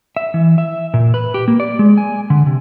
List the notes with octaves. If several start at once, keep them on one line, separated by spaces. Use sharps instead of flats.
E5
E3
E5
A#2
B4
G4
A#3
D5
G#3
G#5
D3
C3